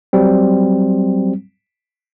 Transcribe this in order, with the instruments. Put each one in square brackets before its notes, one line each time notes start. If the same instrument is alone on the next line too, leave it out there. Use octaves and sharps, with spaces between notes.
[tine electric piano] F#3 G3 C4